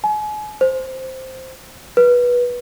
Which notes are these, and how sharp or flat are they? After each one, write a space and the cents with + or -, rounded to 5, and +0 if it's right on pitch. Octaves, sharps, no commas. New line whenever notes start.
G#5 +35
C5 +0
B4 -20